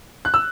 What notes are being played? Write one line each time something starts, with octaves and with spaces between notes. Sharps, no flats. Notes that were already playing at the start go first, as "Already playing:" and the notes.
F#6
E6